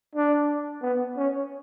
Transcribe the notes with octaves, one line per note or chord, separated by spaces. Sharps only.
D4
B3
C#4